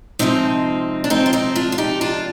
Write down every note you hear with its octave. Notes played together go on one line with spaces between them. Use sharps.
C3 F3 G#3 C4 D#4
D4
C4 D#4
F4
C4 D#4
D4 F4
F4
D#4 G4
D4 F4